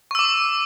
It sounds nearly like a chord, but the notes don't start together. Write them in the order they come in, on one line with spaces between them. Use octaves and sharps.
C#6 E6 D6